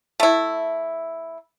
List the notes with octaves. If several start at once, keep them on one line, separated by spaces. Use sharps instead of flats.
A3 E4